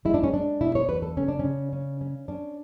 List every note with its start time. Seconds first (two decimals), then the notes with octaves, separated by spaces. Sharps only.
0.05 G#3 E4
0.14 D4
0.24 C#4
0.32 G#3 D4
0.61 B2 E4
0.75 C#5
0.89 E2 B4
1.02 A4
1.17 C#3 C#4
1.28 D4
1.39 C#3 C#4
1.73 C#4
2.01 C#4
2.28 C#4 D4